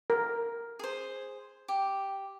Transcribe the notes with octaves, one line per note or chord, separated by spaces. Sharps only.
A#4
G#4 C5
G4